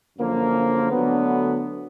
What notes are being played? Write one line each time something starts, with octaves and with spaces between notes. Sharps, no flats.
F#2 D3 F3 A#3
D2 D3 F#3 B3